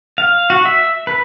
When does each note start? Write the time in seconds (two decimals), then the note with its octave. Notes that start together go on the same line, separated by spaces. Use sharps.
0.18 F5
0.50 F#4
0.65 E5
1.07 B4